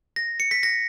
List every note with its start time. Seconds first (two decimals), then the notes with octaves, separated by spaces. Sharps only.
0.16 A#6
0.40 C#7
0.51 B6
0.63 A#6